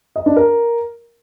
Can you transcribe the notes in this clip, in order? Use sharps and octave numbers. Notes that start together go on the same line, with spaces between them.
D#5
D4
A#4